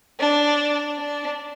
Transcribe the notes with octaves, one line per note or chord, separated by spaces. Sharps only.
D4
D4